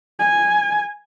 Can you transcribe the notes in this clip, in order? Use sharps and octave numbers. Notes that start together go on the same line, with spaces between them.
G#5